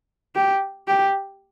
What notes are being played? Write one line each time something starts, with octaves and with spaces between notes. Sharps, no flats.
G4
G4